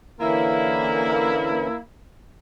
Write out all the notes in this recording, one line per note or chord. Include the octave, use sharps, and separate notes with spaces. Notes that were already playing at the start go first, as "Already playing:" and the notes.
D3 E3 A#3 C#4 E4